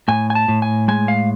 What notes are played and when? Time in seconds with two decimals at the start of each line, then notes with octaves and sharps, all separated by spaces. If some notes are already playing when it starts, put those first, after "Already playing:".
0.08 A2 G#5
0.30 G#5
0.35 A5
0.48 A2
0.62 G#5
0.88 G#3 G#5
1.08 F5